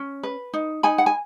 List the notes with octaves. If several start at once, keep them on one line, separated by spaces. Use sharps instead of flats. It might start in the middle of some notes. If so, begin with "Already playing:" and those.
Already playing: C#4
B4
D#4
D#4 G#5 B5
F#5
G#5